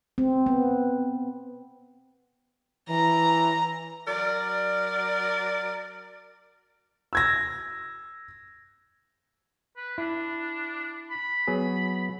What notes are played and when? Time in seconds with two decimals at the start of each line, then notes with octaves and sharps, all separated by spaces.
0.18 C4
0.46 B3
2.89 E3 A#5
4.08 F#3 A#4 D5
7.13 E6 G#6 A#6
9.77 B4
9.98 D4 E4
11.11 B5
11.47 F#3 B3 G#4